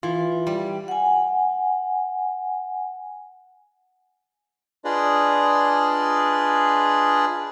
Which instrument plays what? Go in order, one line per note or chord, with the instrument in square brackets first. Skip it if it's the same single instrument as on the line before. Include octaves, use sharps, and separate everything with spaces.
[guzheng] E3 [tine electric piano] F4
[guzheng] G3
[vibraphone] F#5 G#5
[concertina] D4 F4 G#4 B4 D5 D#5